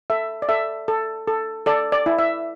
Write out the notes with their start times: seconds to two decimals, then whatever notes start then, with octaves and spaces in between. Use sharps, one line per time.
0.10 A4 E5
0.42 D5
0.49 A4 E5
0.88 A4
1.27 A4
1.66 A4 D5
1.92 D5
2.06 E4
2.19 E5